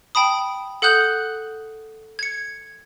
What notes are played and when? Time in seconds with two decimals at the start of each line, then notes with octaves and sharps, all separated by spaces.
0.15 G5 A5 B5 D#6
0.82 A4 F#5 D#6 F#6 G6 F#7
2.19 G#6 C#7